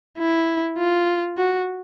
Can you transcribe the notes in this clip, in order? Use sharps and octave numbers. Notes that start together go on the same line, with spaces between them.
E4
F4
F#4